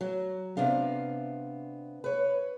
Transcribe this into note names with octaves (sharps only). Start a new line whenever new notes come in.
F#3
C3 B3 D4 F5
B4 C#5